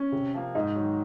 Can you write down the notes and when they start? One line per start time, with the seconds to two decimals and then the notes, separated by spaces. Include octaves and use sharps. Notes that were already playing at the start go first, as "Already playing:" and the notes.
Already playing: C#4
0.12 C3
0.34 F3 A#3
0.55 G#2 D#4
0.76 D#3 F#3